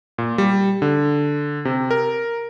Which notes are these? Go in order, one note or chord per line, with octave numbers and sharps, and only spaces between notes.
A#2
G3
D3
C3
A#4